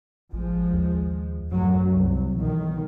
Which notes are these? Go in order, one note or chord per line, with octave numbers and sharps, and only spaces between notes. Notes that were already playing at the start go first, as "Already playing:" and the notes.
A1 F3 G#3
D#2
A1 F#2 F#3
C2
B1 D#3 E3